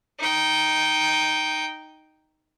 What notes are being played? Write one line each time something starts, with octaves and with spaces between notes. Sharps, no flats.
D#4 G5